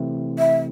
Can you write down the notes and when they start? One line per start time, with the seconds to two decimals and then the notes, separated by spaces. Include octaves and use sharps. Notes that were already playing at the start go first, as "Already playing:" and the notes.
Already playing: C3 E3 A3 C4 E4
0.39 E5